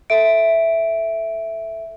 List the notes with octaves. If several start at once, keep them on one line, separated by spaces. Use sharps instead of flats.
A4 E5 D7